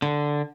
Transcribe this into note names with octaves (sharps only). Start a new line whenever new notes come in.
D3